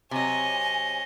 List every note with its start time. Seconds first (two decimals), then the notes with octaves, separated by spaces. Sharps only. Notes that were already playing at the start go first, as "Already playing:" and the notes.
0.11 C3 F#3 C#5 D#5 G#5